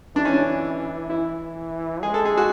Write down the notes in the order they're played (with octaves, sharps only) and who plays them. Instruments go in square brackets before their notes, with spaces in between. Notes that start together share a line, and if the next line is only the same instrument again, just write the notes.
[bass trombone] E3 [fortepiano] D4
[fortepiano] C#4
D4
[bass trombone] E3 [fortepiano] E4
[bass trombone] G#3 [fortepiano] G#4
[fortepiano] A4
G#4
F#4